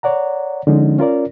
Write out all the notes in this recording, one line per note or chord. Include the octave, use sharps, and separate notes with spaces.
C#5 D5 F#5 A#5
D3 F3 G#3 C#4 D#4
C#4 F4 A#4 D5